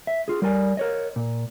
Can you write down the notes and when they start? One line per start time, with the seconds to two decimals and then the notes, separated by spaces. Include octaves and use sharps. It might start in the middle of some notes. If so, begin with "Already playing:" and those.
0.07 E5
0.28 F4 G#4
0.42 G3 A#4 D5 G#5
0.77 A#4 C#5 D#5
1.16 A#2